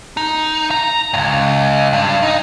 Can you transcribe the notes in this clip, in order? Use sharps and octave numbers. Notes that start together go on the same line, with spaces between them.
D#4
A#5
C#2 G2
G2
D#4